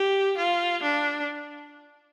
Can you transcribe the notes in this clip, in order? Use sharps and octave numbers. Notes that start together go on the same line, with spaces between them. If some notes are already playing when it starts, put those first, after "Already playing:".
Already playing: G4
F4
D4